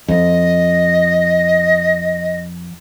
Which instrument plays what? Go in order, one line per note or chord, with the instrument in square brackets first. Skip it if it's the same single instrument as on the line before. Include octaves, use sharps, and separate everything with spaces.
[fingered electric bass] F2 [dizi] D#5